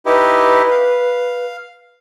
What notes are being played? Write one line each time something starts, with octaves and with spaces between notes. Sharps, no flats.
D#4 E4 G4 B4
F5